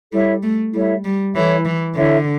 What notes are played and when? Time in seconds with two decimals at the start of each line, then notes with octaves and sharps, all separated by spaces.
0.13 G3 E4 A4 C#5 E5
0.43 A3
0.73 G3 E4 A4 C#5 E5
1.04 G3
1.35 E3 E4 A4 C#5 E5
1.65 E3
1.95 D3 E4 A4 C#5 E5